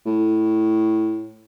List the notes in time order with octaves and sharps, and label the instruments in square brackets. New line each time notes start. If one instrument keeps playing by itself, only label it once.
[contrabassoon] A2